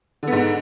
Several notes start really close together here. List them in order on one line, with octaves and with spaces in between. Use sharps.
D3 B3 G#2